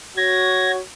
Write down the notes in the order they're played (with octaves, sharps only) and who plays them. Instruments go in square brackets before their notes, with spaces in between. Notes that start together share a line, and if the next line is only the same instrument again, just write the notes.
[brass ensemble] F#4 C#5 [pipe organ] G#6 A#6